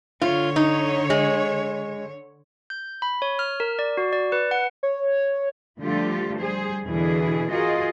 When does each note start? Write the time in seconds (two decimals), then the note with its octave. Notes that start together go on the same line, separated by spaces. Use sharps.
0.22 D3 F4 C#5
0.56 D#4
1.10 G#3
2.70 G6
3.02 B5
3.22 C#5
3.39 F6
3.60 A#4
3.79 D5
3.97 F#4
4.13 D5
4.32 B4
4.51 F#5
4.83 C#5
5.79 D3 F3 G3 A3 F4 G4
6.37 G3 G#4 C5
6.85 E2 B2 D3 E3 E4 G#4
7.50 F4 F#4 G#4 A#4 D#5